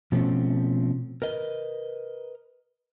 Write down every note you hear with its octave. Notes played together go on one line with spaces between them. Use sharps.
B2 F3 A3 C4 C#4
A#4 B4 D#5